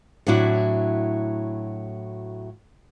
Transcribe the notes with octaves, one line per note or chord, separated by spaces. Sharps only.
A2 F#3 D4 E4 F#4